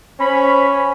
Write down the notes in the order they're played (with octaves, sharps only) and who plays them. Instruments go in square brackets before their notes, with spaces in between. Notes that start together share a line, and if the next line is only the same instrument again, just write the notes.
[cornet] C#4 [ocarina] C5 [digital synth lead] B5